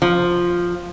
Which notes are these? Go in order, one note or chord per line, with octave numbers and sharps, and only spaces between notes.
F3